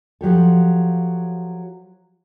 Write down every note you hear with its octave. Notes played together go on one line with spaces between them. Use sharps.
F3 F#3 G4 A4